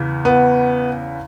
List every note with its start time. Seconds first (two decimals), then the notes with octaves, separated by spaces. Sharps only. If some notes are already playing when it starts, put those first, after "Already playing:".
Already playing: E2 C#3 E3
0.25 B3